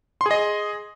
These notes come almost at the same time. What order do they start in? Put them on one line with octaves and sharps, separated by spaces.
C6 G#4 D#5